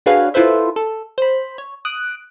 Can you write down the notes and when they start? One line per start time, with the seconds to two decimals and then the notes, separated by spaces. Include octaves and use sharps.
0.06 D4 F#4 G#4 B4 C#5 F5
0.34 E4 F4 A4 B4 C5 E5
0.76 A4
1.18 C5 B5
1.58 C#5
1.85 D#6 F#6 D7